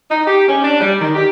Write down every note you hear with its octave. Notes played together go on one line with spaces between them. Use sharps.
D#4
G4
C#4
D4
G3
D#3
G4